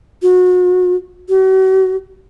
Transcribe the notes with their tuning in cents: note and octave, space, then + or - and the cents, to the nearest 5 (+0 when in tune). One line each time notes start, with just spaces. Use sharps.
F#4 -30
F#4 +40